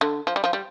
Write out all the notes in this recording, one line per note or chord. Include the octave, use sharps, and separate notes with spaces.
D3
F3
G3
F3
G3